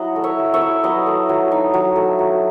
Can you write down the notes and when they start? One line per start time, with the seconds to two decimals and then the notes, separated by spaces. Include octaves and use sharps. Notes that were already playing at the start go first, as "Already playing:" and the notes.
Already playing: F#3 E4 D#5 F#5
0.16 A3
0.24 C#5 E5
0.39 F#3
0.54 C#5 E5
0.61 E4
0.84 F#3 B4 D#5
1.07 A3
1.29 F#3
1.52 D#4
1.74 F#3
1.96 A3
2.19 F#3